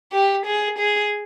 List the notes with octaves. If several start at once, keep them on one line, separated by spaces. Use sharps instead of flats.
G4
G#4
G#4